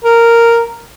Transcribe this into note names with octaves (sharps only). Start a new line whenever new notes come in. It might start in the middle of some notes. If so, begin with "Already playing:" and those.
A#4